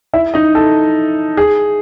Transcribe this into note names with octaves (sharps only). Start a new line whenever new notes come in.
E4 E5
D#4 D#5
A4
G#4